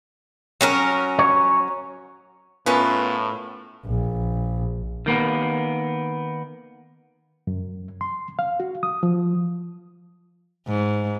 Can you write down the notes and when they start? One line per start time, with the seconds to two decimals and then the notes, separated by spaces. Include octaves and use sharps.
0.61 F#3 C#4 A#4
1.19 C#5
2.66 A2 B3 C#4 E4 F4 A#4 B4
3.86 A#1
5.06 D#3 A#3 B3
7.47 F#2
8.01 C6
8.39 F5
8.60 F#4
8.83 D#6
9.03 F3
10.67 G#2